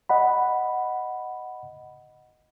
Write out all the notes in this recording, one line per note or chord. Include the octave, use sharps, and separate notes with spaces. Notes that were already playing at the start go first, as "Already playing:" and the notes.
D#5 F#5 B5